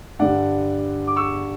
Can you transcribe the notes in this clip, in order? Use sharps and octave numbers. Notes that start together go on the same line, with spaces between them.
G2 D3 G3 D5 F#5
D6
C#6 E6